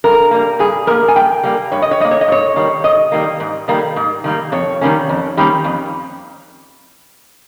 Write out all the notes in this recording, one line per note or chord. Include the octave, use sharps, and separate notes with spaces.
G2 A#4
G3 A#3
G2 G#4
G3 A#3 A#4
G#5
G2 G5
G3 A#3
G2 C#5
D#5
C#5
G3 A#3 D#5
C#5
D#5
G#2 C#5
D#3 G3 A#3
G#2 D#5
D#3 G3 A#3
G#2
D#3 G3 A#3
G#2
D#3 G3 A#3
F2 C#5
D#3 G3 A#3 C#4
F2
D#3 G3 A#3 C#4
F2